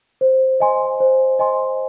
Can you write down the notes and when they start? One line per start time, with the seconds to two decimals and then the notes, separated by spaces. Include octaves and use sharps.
0.21 C5
0.60 D#5 G#5 C6
1.00 C5
1.39 D#5 G#5 C6